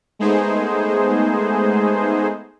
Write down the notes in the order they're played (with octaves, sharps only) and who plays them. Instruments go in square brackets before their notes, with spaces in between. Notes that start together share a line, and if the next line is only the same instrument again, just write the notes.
[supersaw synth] G#3 A3 B3 D#4 G#4 C5